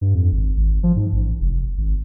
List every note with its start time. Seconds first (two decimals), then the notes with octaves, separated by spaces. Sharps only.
0.01 G2
0.15 F2
0.32 G#1
0.57 G#1
0.83 F3
0.96 G#2
1.13 A1
1.40 F1
1.78 G#1